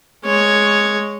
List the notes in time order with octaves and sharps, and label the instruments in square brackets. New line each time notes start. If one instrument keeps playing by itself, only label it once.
[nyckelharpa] G#3 C#5